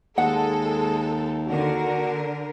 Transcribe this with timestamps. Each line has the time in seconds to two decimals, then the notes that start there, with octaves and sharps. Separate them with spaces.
0.18 D#2 G#3 G#4 A4 F#5
1.48 D3 F#4 A#4